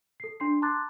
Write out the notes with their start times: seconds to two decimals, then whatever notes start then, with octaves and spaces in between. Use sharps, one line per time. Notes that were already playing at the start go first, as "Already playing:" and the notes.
0.20 A4 C7
0.40 D4 C6 C7
0.62 A5 A#5 C6 D6 F#6 A6